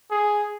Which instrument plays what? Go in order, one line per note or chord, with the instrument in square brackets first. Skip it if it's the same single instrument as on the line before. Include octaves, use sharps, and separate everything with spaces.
[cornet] G#4